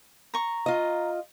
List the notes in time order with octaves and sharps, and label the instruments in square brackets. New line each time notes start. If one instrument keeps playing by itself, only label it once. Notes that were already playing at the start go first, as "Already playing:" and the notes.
[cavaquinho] A#5 C#6
[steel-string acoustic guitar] F4 D#5